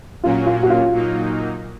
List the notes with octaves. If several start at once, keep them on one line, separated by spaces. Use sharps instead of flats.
A#2 F#3 A#3 C#4 F4
F4
F#4
F4
A#2 F#3 A#3 D#4